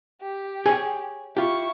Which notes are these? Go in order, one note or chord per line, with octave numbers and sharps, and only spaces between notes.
G4
G#4 C#5 G#5
E4 F4 G4 C#6